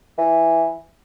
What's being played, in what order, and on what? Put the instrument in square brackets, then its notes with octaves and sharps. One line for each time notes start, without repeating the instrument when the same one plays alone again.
[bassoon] E3